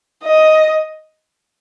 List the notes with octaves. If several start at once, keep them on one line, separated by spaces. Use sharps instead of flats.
D#5